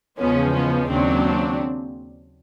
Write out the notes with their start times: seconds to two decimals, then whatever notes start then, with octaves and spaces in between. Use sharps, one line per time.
0.18 E2 C#3 F3 G#3 B3 C#4
0.53 B3 C#4
0.88 D#2 C#3 F#3 C4 D4